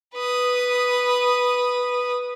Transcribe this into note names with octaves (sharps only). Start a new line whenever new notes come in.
B4 D#6